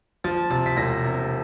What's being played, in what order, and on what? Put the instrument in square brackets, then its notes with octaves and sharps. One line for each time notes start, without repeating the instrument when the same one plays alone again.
[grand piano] F3 A6
C3 A6
B6
E1 A#6
C3